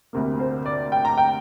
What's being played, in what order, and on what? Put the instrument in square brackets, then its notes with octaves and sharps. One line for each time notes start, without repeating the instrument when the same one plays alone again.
[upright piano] D2 C3 A#3
C5
D5
G5
A#5
G5